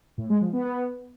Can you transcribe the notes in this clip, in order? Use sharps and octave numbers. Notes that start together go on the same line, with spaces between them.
A2
G#3
F3
B3
B3